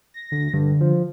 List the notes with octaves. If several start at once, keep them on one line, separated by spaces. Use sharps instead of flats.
A#6
D2
G2 D3
F3